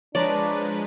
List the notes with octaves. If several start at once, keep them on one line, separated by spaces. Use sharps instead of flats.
F3 G#3 D4 B4 C#5 D5 A5 A#5